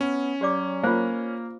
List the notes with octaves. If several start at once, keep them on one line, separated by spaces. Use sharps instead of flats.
B3 C#4
F#3 G4 D5 D6
A#3 F4 C5